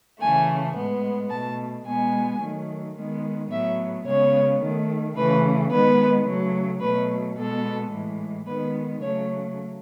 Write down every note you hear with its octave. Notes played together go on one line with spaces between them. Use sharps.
C#3 E3 A3 G#5
A2 G#3 B3
B2 A3 A5
B2 G#3 B3 G#5
D#3 F#3 A3
D#3 G#3 B3
A2 F#3 B3 E5
C#3 G#3 B3 C#5
D#3 A3
C#3 E3 A3 B4
D#3 G#3 B3 B4
C#3 F#3 A3
B2 F#3 A3 B4
B2 G#3 B3 A4
A2 E3 G#3
D#3 G#3 B3 B4
C#3 F#3 A3 C#5